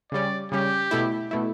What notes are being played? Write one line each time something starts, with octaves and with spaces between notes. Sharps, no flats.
C#3 G3 C#4 D5
C#3 G3 C#4 G4
B2 A3 E4
B2 A3 E4